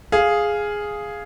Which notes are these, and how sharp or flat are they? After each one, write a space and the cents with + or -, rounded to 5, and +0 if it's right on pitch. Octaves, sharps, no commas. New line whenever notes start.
G#4 +0 F5 +0